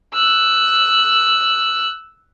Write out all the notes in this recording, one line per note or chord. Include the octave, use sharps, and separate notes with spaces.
E6 F#6